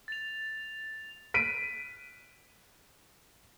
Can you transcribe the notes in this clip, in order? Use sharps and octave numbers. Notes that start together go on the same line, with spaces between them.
A6 F7
B6 D7 D#7